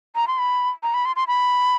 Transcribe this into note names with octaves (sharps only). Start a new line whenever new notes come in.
A#5
C6
B5
A#5
B5
C6
C6
B5